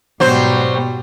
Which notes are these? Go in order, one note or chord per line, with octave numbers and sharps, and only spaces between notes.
G#2 B2 F#3 G3 C5